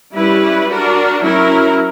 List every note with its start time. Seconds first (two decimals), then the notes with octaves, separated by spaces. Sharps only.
0.16 G3 C#4 E4 B4
0.70 D4 F#4 A#4
1.23 F#3 C#4 E4 A#4